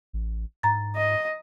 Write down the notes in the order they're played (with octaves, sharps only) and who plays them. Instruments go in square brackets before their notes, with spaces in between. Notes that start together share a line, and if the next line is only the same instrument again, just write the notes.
[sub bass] A1
[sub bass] G#2 [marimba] A#5 A6
[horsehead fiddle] D#5